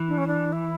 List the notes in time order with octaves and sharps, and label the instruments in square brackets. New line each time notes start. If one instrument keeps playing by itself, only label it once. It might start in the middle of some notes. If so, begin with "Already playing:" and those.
Already playing: [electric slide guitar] E3
[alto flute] D4
C#4
D4
E4